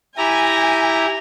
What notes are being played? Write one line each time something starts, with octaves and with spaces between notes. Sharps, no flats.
E4 G4 G#5 A#5